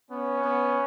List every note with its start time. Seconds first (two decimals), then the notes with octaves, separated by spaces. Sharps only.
0.10 B3 C#4
0.44 B3